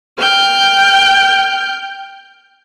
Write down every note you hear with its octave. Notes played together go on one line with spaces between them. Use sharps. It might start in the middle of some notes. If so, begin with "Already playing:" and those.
G5 F6 G6